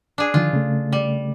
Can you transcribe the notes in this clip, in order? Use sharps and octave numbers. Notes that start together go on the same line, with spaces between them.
D4 G#4
D3 D#3 F3 F4
C#3 A3
G3